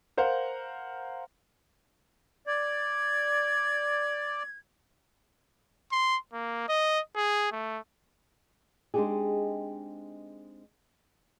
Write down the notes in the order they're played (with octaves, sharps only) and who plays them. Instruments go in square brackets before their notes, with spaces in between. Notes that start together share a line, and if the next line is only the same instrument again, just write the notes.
[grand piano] A#4 C5 F5 F#5
[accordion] D5 [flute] G#6
[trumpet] C6
A#3
D#5
G#4
A3
[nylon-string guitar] G#3 C4 D4 D#4 G4 G#4